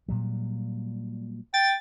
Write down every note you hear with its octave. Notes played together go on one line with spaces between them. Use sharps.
A#2 F#3 G3
G5 A6